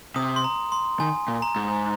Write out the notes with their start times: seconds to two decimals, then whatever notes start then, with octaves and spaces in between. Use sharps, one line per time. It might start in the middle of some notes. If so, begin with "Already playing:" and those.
0.16 C3 D#6
0.36 C6
0.44 A#5
0.72 C6
1.00 D#3 G#5
1.28 A#2
1.42 A#5
1.56 G#2